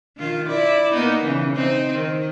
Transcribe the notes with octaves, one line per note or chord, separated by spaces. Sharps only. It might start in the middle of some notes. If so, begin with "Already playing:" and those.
D#3 F4
E4 D5
A#3 B3 D#4
C#3 E3
C4 D#4
D#3